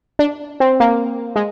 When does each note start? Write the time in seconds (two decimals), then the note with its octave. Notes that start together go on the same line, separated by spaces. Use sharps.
0.19 D4
0.60 C4
0.80 A#3
1.36 G#3